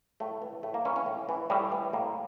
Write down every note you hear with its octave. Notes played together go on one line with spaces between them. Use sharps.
A2 A3
E3
A2 A3
A#3
E3 C#4
C#4
A2
E3
A2 G3
E3
A2 A#3